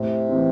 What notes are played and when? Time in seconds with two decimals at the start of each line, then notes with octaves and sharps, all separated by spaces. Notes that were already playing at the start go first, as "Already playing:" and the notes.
Already playing: A2 C3
0.29 E3 A3 C4 D#4